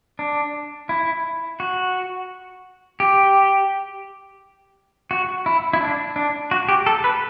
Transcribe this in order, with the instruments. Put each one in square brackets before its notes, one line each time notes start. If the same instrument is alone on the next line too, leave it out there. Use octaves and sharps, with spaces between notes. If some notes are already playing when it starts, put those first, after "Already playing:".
[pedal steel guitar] D4
E4
F#4
G4
F#4
E4
E4
D4
D4
F#4
G4
A4
B4